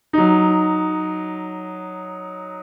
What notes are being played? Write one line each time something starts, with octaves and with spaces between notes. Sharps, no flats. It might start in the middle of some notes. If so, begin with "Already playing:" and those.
F#3 D#4